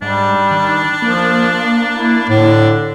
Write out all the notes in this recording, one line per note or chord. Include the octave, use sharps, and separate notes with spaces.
G#2 G3 D4
D#3
F3 A#3
E4
A2 D3 D4